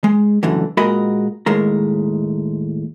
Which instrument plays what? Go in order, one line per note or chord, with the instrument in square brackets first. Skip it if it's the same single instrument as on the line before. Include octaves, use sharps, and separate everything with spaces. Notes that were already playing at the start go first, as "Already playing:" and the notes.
[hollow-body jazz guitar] G#3
C#2 F#2 A2 D3 E3
A#2 G#3 F#4 A#4 D#5 B5
D#2 A2 G#3 A#4